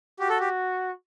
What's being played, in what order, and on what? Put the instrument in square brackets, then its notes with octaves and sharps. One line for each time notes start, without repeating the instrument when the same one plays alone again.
[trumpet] F#4 [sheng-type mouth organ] G4
[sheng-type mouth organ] A4
G4